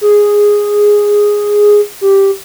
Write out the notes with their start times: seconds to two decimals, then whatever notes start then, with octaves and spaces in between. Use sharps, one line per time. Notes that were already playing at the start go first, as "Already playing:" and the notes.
0.01 G#4
2.01 G4